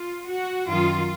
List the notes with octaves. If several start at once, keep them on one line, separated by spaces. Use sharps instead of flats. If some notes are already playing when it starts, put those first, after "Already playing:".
Already playing: F4
F#4
F#2 D#3 F4